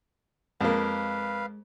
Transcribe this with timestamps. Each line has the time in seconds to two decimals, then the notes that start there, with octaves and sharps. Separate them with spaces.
0.61 F2 G#3 A#3 B4 F5